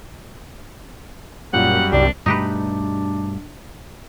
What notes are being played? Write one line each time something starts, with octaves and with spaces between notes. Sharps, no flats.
F#2 A#2 G3 C#4 F4 F#5
C2 D4 G4 D5
G2 B2 A3 D4 D#4 G4 B4